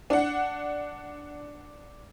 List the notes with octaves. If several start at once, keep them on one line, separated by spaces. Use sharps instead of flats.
D4 F#5